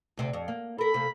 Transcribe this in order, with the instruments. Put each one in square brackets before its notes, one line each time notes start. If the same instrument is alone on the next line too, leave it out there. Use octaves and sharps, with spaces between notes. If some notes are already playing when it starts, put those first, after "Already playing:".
[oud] D2 C3 C4
F2
A#3
[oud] A4 A#4 [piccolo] B5
[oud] C3 A#3